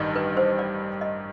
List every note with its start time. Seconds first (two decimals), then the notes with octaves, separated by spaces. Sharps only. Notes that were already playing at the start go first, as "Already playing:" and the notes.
Already playing: A1 G2 D#3 G3
0.15 B4
0.37 C5
0.59 D5
1.01 D#5